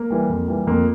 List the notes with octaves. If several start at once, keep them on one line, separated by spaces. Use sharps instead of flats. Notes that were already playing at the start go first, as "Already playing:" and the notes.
Already playing: A#3
E3 G3
F2
E3 G3
F2 A#3